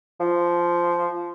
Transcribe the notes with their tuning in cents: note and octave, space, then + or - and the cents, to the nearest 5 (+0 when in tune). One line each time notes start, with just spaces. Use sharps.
F3 -10